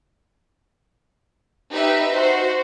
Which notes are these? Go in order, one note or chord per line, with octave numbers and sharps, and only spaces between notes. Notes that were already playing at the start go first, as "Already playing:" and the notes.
D#4 G4 B4 E5
F#4 C5